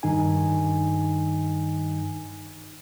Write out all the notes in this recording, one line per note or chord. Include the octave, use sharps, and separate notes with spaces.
G2 D#3 D#4 G#5